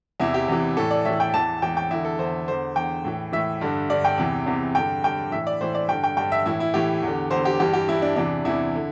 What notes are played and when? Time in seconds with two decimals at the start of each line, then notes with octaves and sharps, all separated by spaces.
0.20 E2 C3 E3 E4
0.34 G4
0.48 E2 C3 E3
0.77 A2 E3 A4
0.91 D5
1.05 A2 E3 E5
1.20 G5
1.34 E2 E3 A5
1.62 E2 E3 G5
1.77 G5
1.91 E2 D3 E4
2.05 A4
2.19 E2 D3 C5
2.48 E2 D3 C5
2.76 E2 D3 G5
3.04 A2 E3
3.33 A2 E3 E5
3.61 G2 D3
3.90 G2 D3 D5
4.05 G5
4.18 E2 C3 E3
4.46 E2 C3 E3
4.75 G2 D3 G5
5.04 G2 D3 G5
5.32 A2 E3 E5
5.47 D5
5.61 A2 E3 C5
5.75 D5
5.88 G2 D3 G5
6.04 G5
6.17 G2 D3 G5
6.32 E5
6.46 A2 E3 E4
6.60 E4
6.74 A2 E3 G4
7.03 E2 D3
7.31 E2 C5
7.36 D3
7.45 G4
7.60 G2 E3 G4
7.73 G4
7.88 G2 E3 E4
8.02 D4
8.16 E2 C3 E3 D4
8.45 E2 C3 E3 E4
8.75 D3